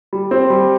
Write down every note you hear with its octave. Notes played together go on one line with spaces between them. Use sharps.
G3
C4
G3